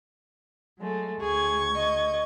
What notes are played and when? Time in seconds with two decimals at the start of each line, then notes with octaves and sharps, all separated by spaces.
0.79 F#3 G#3 A3
1.21 D2 G#4 C#6 G#6
1.75 D#5